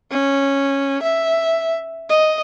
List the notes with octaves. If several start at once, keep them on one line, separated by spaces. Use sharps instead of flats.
C#4
E5
D#5